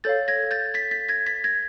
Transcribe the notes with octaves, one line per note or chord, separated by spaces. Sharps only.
A4 C#5 F5 G6 A6
G#6 A#6
G6 A6
A6 B6
A6 B6
G#6 A#6
A6 B6
G#6 A#6